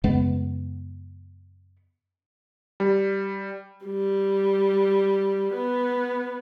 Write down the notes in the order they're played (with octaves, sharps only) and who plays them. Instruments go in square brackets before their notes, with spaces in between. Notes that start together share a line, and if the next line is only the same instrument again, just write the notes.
[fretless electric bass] F#2 C#3 G#3 B3
[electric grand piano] G3
[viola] G3
B3